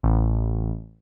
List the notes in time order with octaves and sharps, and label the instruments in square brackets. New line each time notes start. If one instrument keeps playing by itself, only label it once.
[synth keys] A1